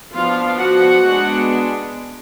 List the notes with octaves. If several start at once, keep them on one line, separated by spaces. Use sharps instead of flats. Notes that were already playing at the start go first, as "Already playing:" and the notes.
F3 B3 D4 F4 F5
F#4 F#5
G#3 B3 D4